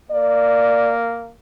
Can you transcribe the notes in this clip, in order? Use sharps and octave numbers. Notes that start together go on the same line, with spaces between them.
A#3 D5